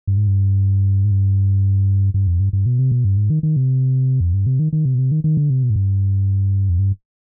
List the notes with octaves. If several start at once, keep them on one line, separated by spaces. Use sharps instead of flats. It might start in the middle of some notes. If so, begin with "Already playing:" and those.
G2
G#2
G2
G#2
G2
G2
F2
G2
G2
B2
C3
B2
G2
G#2
D#3
D#3
C3
F2
G2
C3
D#3
D#3
C3
B2
C3
D#3
D#3
D3
C3
B2
G#2
G2
F2
G2